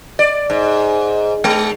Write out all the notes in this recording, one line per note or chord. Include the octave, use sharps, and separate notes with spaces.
D5
G#2
G#3